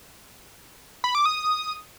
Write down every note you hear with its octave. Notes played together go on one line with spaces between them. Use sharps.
B5
D6
D#6